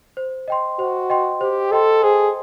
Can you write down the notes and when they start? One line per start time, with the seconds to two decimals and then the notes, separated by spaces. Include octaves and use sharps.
0.17 C5
0.48 D#5 G5 C6
0.79 F#4 C5
1.10 D#5 G5 C6
1.41 G4 C5
1.72 A4 D#5 G5 C6
2.03 G#4 C5